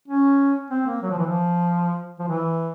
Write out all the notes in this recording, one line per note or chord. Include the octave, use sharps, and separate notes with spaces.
C#4
C4
A#3
F#3
F3
E3
F3
F3
E3